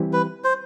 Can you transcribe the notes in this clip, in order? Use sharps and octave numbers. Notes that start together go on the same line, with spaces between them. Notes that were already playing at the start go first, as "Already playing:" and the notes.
Already playing: E3 G3 C4 E4 G4
B4
C5